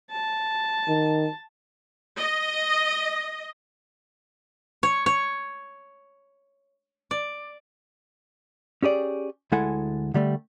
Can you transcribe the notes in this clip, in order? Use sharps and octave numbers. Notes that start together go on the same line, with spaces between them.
A5
D#3
D#5
C#5
C#5
D5
C#4 G4 G#4 D5
D2 G#3 E4 A4 F#5 G#5
D3 G3 A3